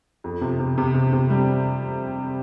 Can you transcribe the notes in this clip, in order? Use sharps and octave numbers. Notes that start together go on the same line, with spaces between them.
F2
C3
C3
C3
C3
C3
G3